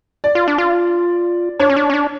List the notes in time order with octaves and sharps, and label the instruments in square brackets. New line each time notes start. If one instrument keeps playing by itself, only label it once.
[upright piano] D5
[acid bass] F4
D4
F4
[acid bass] D4 [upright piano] C#5
[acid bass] C#4
D4
C#4
D4